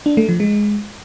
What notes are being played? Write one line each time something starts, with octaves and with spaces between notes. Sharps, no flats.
D4
A3
F3
G#3